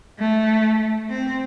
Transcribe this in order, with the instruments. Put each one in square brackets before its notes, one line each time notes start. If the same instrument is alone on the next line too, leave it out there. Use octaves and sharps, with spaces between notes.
[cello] A3
C4